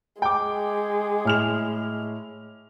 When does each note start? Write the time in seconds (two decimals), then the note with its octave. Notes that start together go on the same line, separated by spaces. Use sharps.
0.22 G#3 G5 D6
1.25 A2 F6 F7